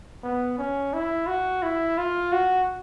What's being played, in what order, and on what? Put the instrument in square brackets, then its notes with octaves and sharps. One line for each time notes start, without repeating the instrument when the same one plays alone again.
[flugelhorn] B3
C#4
E4
F#4
E4
F4
F#4